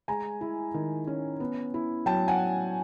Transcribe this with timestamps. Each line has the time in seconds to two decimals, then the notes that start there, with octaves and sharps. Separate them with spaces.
0.08 G#3 G#5 A#5
0.41 E4
0.74 D#3
1.07 C#4
1.40 B3
1.74 E4
2.06 F#3 G5 A5
2.28 F#5 G#5